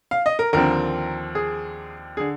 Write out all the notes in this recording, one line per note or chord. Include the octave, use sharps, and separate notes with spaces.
F5
D#5
A#4
D#2 D3 F3 C4 A#4
G#4
D3 G#4